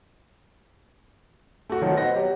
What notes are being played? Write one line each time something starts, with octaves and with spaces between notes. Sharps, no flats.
A3 F#4
D#3 F3 F#3
B2 C5 F#5 A#6
F#3 G4